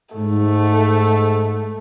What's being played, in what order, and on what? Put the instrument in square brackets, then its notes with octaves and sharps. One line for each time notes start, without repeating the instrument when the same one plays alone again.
[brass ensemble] G#2 [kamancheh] A3